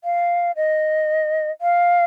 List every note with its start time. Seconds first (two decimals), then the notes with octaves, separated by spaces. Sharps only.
0.04 F5
0.56 D#5
1.61 F5